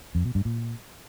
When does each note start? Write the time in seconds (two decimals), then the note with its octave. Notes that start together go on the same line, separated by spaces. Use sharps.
0.15 F2
0.25 B2
0.35 G2
0.45 A#2